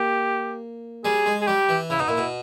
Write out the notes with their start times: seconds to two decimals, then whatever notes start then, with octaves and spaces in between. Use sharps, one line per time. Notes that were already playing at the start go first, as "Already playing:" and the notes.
Already playing: A#3 G4
1.05 G3 G#4
1.26 G#3
1.42 G#4
1.47 G3 G4
1.69 E3
1.90 C#3 E4
1.99 B2 D#4
2.08 A#2 E4
2.18 B2